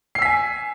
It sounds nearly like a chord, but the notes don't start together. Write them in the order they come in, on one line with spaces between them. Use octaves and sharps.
C7 E6 B6 G#5